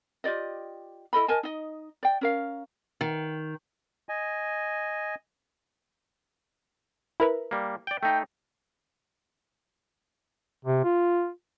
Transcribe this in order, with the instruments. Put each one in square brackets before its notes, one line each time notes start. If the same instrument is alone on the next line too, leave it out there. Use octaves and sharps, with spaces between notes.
[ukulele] F4 G4 D5 D#5
E4 A4 D#5 B5
A#4 D#5 G#5 A5
D#4 D#5
D5 G5
C#4 A#4 F5
[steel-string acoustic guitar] D#3
[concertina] D#5 G#5
[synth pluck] E4 A#4 B4
[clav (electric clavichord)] G3 A#3
D5 G5
[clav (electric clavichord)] A3 D#4 [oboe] G5
[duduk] C3
F4